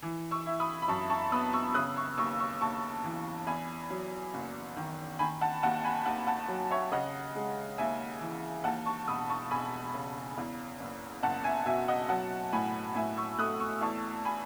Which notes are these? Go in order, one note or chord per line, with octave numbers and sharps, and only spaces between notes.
E3
C#6 E6
E4
B5 D#6
B5
F#2 A5 C#6
A5 C#6
B3 B5 D#6
C#6 E6
C#3 D#6 F#6
C#6 E6
D#2 C#6 E6
C#6 E6
D#2 A5 C#6
E3
E2 G#5 B5
F#3
F#1
D#3
D#3 G#5 B5
F#5 A5
D#2 F#5 A5
G#5 B5
D#2 F#5 A5
F#5 A5
F#3
C#5 E5
C#3 D#5 F#5
G#3
D#2 E5 G#5
E3
D#2 F#5 A5
A5 C#6
E1 B5 D#6
A5 C#6
E1 G#5 B5
C#3
E2
F#1
F#1 F#5 A5
E5 G#5
B2 E5 G#5
D#5 F#5
F#3 F#5 A5
A2 G#5 B5
A2 E5 G#5
C#6 E6
A3 D#6 F#6
C#6 E6
E2 A5 C#6
G#5 B5